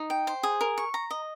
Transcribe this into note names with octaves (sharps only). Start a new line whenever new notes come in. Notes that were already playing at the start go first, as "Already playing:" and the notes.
Already playing: D#4
G5
C5
G#4
A#4
C#6
A#5
D#5